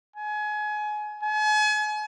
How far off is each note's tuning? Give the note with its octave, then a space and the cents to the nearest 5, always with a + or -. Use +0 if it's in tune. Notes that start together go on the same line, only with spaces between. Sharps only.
G#5 +25
G#5 +40